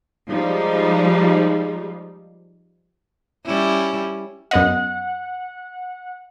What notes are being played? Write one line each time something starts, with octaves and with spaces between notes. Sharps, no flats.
F3 G3 G#3 D#4
G3 C#4 E4
F#2 B3 D#5 F#5